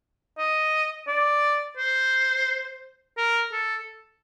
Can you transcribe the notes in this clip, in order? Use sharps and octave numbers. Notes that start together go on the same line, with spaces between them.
D#5
D5
C5
A#4
A4